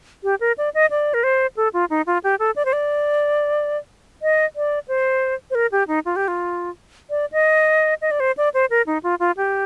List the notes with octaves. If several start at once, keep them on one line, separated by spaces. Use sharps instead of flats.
G4
A#4
D5
D#5
D5
A#4
C5
A4
F4
D#4
F4
G4
A4
D5
C5
D5
D#5
D5
C5
C5
A#4
G4
D#4
F4
G4
F4
D5
D#5
D#5
D5
C5
D5
C5
A#4
D#4
F4
F4
G4